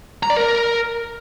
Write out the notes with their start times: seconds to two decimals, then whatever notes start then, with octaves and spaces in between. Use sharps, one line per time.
0.23 A#5
0.30 D5
0.37 A#4